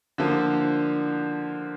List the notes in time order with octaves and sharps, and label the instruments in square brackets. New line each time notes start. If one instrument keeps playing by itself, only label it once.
[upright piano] D3 F3 A#3